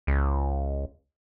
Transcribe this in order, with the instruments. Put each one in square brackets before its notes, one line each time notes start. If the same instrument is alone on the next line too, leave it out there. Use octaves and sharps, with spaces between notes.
[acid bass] C#2